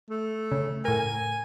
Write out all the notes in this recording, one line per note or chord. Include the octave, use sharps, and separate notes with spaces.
A3
C#3
A2 A#4 G#5